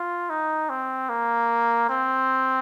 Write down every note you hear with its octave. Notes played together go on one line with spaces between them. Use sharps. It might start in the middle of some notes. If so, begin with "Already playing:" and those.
Already playing: F4
D#4
C4
A#3
C4